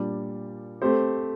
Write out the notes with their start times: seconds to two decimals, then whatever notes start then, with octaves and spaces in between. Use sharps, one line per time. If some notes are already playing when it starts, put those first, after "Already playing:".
Already playing: A#2 G3 D4
0.82 A3 C4 G4 C5